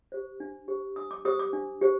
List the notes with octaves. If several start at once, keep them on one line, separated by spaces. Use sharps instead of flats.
G4 C5
D4
G4 C5
D4 D#6
D6
G4 C5 D#6
D6
D4
G4 C5